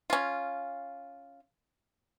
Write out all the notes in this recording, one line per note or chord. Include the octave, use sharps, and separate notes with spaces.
C#4 F4